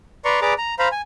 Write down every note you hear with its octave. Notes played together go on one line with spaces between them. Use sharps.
B4 D5 A#5 C6 C#6
G#4 B4 D5 A#5 D6
A#5
C5 F5 A#5 B5
G#5